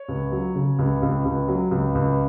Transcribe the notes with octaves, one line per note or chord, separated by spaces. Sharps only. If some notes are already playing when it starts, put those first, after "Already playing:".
Already playing: C#5
C#2
F#3
C#3
C#2
C#2
C#2
F#3
C#2
C#2